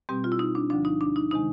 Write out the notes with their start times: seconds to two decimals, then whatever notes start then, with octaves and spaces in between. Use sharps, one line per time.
0.09 B2 G3 C4 G4
0.24 F4
0.32 E4
0.39 D#4
0.55 D4
0.70 D2 D3 F3 D4
0.85 D#4
1.01 D4
1.16 D#4
1.31 C3 D#3 G#3 D#4